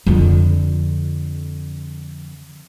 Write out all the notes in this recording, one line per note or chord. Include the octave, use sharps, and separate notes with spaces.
F2 D3